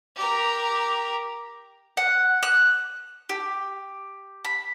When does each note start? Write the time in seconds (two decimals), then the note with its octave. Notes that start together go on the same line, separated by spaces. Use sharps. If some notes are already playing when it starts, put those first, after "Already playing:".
0.16 G4 A#4
1.97 F#5
2.43 F#6
3.29 G4
4.45 B5